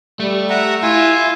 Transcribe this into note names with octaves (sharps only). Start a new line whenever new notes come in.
G3 A3
E5 F#5 A#5
E4 F4 E5 G#5